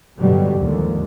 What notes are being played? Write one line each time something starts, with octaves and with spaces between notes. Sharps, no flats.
G2 B2 D3 F#3 G3
D#2 G#2 D3 F3